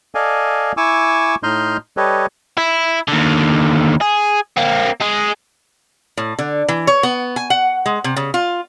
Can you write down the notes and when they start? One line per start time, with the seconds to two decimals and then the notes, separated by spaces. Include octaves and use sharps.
0.15 A4 D5 D#5 F5 G#5
0.77 E4 G#5 C#6 D6 E6
1.43 A2 D#4 D#5 C6 F6 G6
1.97 G3 G4 A4 B4 C#5 D#5
2.57 E4
3.08 D#2 D3
4.01 G#4
4.57 A#3 C4
5.01 G#3 G#4
6.17 A2
6.39 D3
6.68 E3
6.87 C#5
7.03 B3
7.36 G#5
7.50 F#5
7.86 G#3
8.04 C3
8.16 C#3
8.34 F4